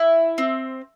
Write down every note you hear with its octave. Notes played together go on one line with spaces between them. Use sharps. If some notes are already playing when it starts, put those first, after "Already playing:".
Already playing: E4
C4